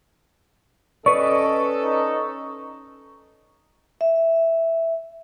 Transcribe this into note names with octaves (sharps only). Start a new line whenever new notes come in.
C#4 A4 B4 D5 D#5 C#6
D#4
E5